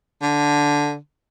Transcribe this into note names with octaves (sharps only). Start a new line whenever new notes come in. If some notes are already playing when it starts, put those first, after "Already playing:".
D3